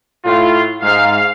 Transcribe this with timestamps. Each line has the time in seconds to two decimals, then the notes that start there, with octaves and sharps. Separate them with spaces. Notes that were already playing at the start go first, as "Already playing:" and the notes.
0.24 A2 F4
0.83 G#2 F5